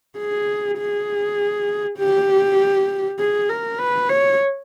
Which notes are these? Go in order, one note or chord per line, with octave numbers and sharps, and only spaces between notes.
G#4
G#4
G4
G#4
A#4
B4
C#5